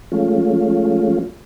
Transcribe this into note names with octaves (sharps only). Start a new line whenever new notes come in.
F3 G#3 A3 C#4 F4